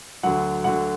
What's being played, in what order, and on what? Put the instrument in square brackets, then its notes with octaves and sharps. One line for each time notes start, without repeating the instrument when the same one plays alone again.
[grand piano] D2 D3 F#3 F#5
D2 D3 F#3 F#5